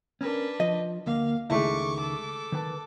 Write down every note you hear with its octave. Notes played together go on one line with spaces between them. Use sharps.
C#4 D4 A#4 B4
F3 D#5
D2 A#3 F5
C#2 D#3 G#3 A3 E4 C#6 D6
A4 D6
D#3 B4 A5